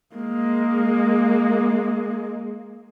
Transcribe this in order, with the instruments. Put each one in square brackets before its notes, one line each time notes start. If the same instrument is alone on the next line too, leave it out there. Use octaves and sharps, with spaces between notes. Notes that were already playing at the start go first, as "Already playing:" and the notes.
[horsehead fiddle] G#3 A#3